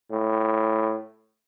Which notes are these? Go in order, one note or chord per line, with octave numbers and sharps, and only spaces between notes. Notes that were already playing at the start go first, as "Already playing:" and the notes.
A2